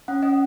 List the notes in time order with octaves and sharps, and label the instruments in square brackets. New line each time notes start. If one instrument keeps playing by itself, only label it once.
[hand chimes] C#4 F#5
C#4 D#5